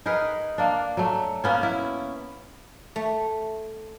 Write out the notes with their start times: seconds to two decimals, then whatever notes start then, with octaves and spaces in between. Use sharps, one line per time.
0.06 D#4 G#4 A#4 B4
0.58 A#3 D4
0.97 F#3 A3
1.44 A#3 B3 C#4
1.63 E4
2.96 A3